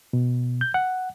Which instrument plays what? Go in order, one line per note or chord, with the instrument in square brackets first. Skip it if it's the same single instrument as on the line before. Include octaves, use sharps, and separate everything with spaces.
[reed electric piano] B2
G6
F#5